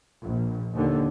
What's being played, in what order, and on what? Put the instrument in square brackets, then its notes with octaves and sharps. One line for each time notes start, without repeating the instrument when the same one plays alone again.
[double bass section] A#1
D#2 D3